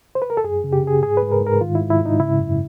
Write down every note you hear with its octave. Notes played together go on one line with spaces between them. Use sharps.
C5
B4
A#4
A4
F#2 G#4
C#3
G4
C#3 G#4
G#2 G#4
B4
G#2
A#4
G#2
A#4
D#3 F4
G#2 E4
E4
G#2
D#4
C#3 E4
F#2